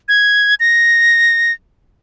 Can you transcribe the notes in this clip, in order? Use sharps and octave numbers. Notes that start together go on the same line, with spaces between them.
G#6
A#6